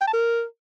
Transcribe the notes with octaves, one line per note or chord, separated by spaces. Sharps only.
G5
A5
A#4